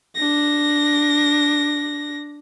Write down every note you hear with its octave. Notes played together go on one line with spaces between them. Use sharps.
D4 A#6